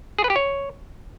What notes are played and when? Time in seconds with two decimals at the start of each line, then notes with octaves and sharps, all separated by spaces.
0.19 G#4
0.24 B4
0.30 G4
0.36 C#5